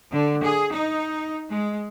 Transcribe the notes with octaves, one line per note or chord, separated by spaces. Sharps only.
D3
G#4
D#4
G#3